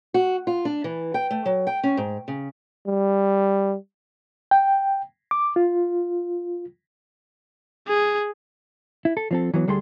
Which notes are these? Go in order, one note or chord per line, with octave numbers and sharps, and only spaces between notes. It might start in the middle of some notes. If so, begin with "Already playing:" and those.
F#4
F4
D4
E3
G5
A3
F#3
G5
C#4
G#2
C#3
G3
G5
D6
F4
G#4
E4
A4
F3 C4 A4
E3 F#3 B3
D2 G3 G#4 A4 C6